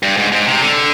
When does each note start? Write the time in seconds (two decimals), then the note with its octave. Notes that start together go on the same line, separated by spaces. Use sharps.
0.03 G2
0.17 G#2
0.32 G#2
0.47 C3
0.62 D3